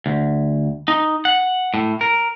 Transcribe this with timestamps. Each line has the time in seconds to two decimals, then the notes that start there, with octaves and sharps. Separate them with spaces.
0.06 D2
0.88 D#4
1.25 F#5
1.74 A2
2.01 A#4